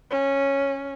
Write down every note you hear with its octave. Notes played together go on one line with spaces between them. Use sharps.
C#4